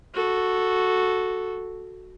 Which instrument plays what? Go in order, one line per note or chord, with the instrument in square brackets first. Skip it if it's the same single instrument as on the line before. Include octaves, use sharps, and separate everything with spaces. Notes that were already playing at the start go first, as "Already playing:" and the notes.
[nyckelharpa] F#4 A4